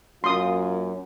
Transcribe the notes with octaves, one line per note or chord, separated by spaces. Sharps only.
F#2 A#3 F4 C6 D#6